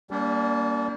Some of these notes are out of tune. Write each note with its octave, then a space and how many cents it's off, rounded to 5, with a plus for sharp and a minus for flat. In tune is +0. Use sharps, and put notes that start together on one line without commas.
G3 +0 A#3 +0 D4 -40